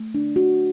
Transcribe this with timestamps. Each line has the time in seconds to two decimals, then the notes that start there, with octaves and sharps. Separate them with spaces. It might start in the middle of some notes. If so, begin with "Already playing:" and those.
Already playing: A3
0.15 D4
0.36 F#4